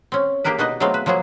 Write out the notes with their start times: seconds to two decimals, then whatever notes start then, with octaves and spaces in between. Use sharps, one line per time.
0.12 C4 C#4
0.44 A#3 G4 G#4 A#4 B4
0.59 B2 D#4 B4 D#5
0.80 F#3 G#3 A3 B3 C4 F5
0.94 B4
1.06 F3 F#3 A#3 B3 G#4